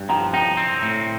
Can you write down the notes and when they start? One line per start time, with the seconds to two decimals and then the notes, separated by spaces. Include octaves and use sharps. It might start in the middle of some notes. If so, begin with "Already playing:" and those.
Already playing: G2
0.09 F3 G5 A#5
0.33 D#4 G5 A#5
0.57 C4
0.82 A2